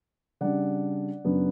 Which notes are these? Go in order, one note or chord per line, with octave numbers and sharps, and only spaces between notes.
C#3 G3 D4 D5 F#5
F#2 C#3 F#3 B3 D4